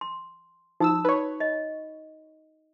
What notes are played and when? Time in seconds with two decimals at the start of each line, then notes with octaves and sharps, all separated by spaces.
0.01 C6
0.80 F3 D#4 F#4 D#6 E6
1.05 D#4 B4 C#5
1.40 D#5